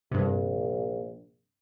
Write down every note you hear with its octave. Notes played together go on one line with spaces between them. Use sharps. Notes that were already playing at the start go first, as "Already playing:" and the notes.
A#1 G2 C3